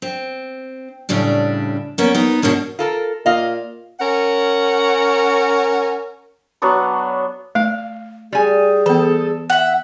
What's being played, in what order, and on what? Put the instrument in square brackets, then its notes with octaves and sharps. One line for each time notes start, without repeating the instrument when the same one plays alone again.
[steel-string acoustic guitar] C4
A2 C#3 G3 D4
A#3 B3 C#4
B3 D#4
B2 G#3 A#3 C#4 D4
[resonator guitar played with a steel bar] F4 A4 A#4
[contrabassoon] A#2 [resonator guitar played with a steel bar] D#5 F5
[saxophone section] C#4 A#4 F#5
[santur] F#3 B3 D4 C#6
[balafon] A3 [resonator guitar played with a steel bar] F5
[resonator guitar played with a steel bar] G3 G#5 [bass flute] G#4
[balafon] E3 B3 [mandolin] A4
[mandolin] E5 F#5